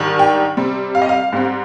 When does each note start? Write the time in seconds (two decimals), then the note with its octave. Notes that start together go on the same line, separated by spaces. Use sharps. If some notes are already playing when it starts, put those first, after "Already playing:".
Already playing: G#2 D#3 G3 D4
0.19 G5
0.57 C3 G3 C4
0.95 F5
1.02 D#5
1.09 F5
1.33 G#2 G3 C4